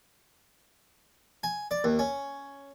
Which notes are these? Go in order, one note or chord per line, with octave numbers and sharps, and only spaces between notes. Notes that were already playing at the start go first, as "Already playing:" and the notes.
G#5
D5
D#2
C#4